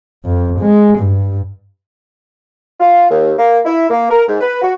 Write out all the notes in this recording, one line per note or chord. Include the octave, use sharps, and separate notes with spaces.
F2
G#3
G2
F4
D#2
A#3
E4
A#3
A#4
G#2
B4
F#4